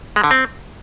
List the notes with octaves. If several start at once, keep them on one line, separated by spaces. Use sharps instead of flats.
G#3
D3
C4